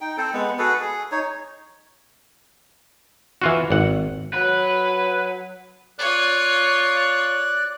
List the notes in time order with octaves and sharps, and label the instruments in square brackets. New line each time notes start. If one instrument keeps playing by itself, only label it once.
[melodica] D#4 G5
C4 A4 C5
G#3 B3
F#4 G#4 A4 B4
G#4
D#4 C#5
[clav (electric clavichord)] E3 F4 F#4
G#1 F#5
[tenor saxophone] F#3 [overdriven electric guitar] B4
[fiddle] F4 C#5 [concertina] D5 F#6